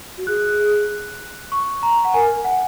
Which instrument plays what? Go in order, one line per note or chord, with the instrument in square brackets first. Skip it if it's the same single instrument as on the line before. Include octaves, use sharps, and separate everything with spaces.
[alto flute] F#4
[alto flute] G#4 [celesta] F#6
[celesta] C#6
A#5
F#5
[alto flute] A#4 [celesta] G#5
[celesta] F#5